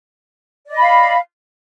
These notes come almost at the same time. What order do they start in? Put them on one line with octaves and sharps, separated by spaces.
D5 D#5 B5 F5